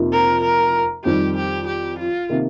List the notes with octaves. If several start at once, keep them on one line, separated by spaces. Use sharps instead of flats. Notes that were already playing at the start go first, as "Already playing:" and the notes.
Already playing: F2 C3 F3 A#3 D#4
A#4
A#4
F2 D#3 G3 G4
G4
G4
F4
C3 D#3 A#3